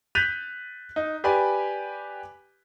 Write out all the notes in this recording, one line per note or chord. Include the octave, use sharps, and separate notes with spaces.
F#6 G6 A6 B6 D#7 F7
D#4
G4 B4 D5 G#5 B5